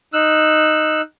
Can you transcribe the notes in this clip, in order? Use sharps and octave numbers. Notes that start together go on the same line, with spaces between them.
D#4 E6 F#6